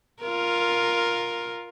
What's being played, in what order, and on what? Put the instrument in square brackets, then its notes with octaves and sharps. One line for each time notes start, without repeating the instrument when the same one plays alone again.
[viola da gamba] F4 A#4